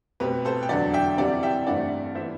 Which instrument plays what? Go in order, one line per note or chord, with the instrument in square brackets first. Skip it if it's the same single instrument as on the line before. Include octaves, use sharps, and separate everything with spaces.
[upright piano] B2 A3 C4 G4 B4
A4 C5
G5
E2 D3 F#3 D5 F#5
E5 G5
C3 E3 G3 D5 F#5
E5 G5
G2 E3 A3 C4 D5 F#5
E3 B3 C5 E5